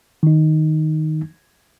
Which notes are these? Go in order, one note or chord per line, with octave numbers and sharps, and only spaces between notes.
D#3 D#4